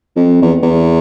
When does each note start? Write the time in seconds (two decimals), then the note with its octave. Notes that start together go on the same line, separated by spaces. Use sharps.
0.16 F2
0.42 E2
0.63 E2